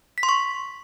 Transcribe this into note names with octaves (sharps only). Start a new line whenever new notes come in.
B6
C6
C#6